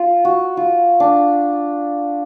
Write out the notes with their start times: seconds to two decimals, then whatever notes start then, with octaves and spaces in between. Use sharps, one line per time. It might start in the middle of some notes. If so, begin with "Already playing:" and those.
Already playing: F4
0.25 F#4
0.57 F4
1.00 D4